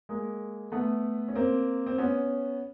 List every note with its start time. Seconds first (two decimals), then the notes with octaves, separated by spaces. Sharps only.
0.09 G#3 A#3
0.72 A3 B3
1.28 C#4
1.35 A#3 C4
1.86 C4
1.98 B3 C#4